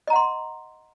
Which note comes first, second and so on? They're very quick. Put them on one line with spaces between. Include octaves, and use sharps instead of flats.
D#5 A#5 F#5 C6